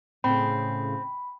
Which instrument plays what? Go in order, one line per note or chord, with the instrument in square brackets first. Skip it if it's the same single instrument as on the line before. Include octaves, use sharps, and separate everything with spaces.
[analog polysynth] A2 C#3 [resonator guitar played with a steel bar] C4 [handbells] B5